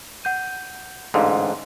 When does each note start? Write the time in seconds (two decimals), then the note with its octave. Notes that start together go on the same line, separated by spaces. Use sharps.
0.24 F#5 G6 D#7
1.14 A1 G#2 D3 F5 C6